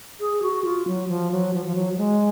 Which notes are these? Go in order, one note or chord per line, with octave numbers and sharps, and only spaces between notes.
G#4
F#4
F4
F#3
F3
F#3
F3
F3
F#3
F#3
G#3